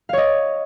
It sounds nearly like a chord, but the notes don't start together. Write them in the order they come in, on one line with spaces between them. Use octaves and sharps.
F5 C#5 D#5